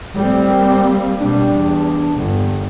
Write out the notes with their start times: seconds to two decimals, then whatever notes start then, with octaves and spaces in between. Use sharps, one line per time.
0.15 A2 G3 C4
0.50 A#3
1.20 B2 G3 D4
1.55 E2
2.16 G1